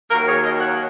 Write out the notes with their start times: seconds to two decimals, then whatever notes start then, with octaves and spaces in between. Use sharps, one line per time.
0.10 D#2 D#3 F#3 A#3 F#4 A#4
0.27 G#4 C#5
0.43 A#4 D#5
0.61 C#5 F#5